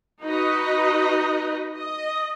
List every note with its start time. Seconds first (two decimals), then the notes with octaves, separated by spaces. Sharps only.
0.22 D#4 F#4 B4 D#5
1.76 D#5